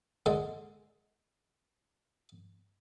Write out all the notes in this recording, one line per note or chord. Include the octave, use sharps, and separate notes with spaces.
D3 G#3